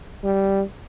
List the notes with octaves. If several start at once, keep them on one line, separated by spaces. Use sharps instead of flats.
G3